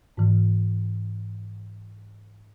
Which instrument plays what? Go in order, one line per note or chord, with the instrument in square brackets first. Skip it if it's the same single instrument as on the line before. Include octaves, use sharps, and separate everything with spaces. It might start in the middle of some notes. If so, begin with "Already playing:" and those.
[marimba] G#2 E3